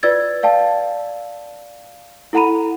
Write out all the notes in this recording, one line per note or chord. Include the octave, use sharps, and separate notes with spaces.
F4 B4 D5 E6 G#6 A6
D5 F5 G5 A5
E4 A4 F#5 A#5 B5 D#7